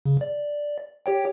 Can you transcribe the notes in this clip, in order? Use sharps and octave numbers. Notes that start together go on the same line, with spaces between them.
C#3
D5
G4 C#5 G5